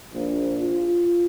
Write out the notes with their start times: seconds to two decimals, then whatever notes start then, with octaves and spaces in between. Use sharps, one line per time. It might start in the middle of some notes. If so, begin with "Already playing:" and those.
0.13 A#1
0.62 F4